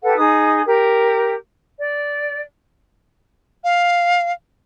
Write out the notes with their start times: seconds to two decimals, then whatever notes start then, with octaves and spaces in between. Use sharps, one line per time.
0.02 G4 A4 B4 F#5
0.17 D#4 G#4 D#6
0.65 G4 A#4
1.77 D5
3.64 F5